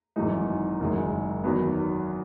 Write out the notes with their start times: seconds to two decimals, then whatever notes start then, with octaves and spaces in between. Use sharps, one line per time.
0.16 G#1 F#2 E3 G#3 D#4
0.80 F#1 F#2 D#3 G#3
1.44 E2 D#3 F#3 B3